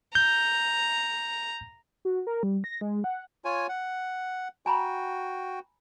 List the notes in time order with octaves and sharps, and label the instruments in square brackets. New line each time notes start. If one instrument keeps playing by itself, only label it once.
[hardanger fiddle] A#5 [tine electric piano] G6
[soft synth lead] F#4
A#4
G3
A#6
G#3
F#5
[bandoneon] F4 C#5 G#5
F#5
[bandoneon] F#4 G5 [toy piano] G#5 A#5 B5